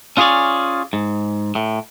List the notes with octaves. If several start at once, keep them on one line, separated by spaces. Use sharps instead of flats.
C#4 F4 G#4 B4 C#5 D5
G#2
A2